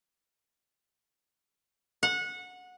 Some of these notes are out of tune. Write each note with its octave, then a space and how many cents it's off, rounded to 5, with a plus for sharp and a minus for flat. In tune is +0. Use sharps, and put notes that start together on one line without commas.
F#5 -20